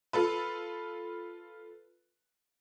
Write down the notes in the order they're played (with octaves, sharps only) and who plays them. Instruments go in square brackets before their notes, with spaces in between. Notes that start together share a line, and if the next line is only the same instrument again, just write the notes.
[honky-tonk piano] F4 A4 B4